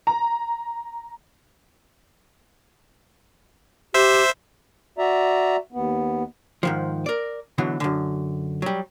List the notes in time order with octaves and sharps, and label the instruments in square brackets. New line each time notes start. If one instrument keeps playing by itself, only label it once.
[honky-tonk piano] A#5
[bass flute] G4 [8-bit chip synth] C5 E5
[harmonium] F#4 D5 E5 A#5
D#2 B3
[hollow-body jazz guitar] G#2 D#3 F3
A#4 D5
B2 D3 E3 F#3
F#2 D3
F#3 G3